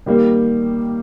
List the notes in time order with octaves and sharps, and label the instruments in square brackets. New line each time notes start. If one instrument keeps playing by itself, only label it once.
[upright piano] D#3 G3 A#3